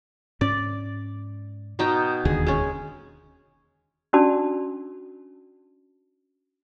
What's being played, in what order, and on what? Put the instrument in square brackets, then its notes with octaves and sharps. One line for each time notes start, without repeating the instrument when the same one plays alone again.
[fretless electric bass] G#2 C#4 [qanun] D5
[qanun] B2 D#4 G5
[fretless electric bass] E1 D#2 D3 [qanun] G#4
[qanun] G#3 C#4
[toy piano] C#4 D4 F#4 D5 A5